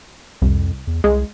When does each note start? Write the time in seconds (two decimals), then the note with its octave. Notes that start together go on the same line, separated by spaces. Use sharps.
0.42 C2 F2
0.87 E2
1.04 C2 G#3